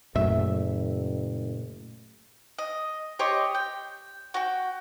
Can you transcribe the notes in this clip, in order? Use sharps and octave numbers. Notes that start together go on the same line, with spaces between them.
F#1 F#2 A#2 A3 E5
D#5
G4 C#5 D#5 C6
G5
F#4 G5